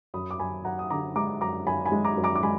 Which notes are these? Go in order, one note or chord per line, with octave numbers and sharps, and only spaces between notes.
F#2 B5 D#6
D6
F#2 G#5 B5
F#2 F#5 A#5
D#6
D3 A#5 D6
G#3 A#5 D6
F#2 A#5 D6
F#2 G#5 B5
G#5 B5
G#3
A#5 D6
F#2
A#5 D6
D6
G#3 G#5 B5